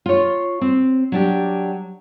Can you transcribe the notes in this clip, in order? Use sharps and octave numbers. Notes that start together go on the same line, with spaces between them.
F4 C#5
C4
F#3 D4 G4